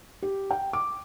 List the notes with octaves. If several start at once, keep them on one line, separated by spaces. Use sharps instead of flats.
G4
G5
D6